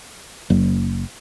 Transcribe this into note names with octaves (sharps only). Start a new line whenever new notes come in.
F#1